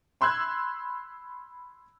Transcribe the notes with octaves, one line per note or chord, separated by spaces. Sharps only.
B5 C6 E6 F#6 G#6